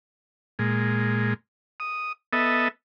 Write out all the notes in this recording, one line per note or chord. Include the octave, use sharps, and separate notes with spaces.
A#2 G#3
D#6
B3 A4 D#5 E5